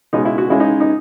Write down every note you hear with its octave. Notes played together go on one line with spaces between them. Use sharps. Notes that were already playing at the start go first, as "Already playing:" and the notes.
C#2 B2 G#3 D#4
E4
F#4
C#2 C#3 G#3 E4
D#4
D#4